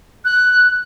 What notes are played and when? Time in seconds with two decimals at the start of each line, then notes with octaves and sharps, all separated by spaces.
0.25 F#6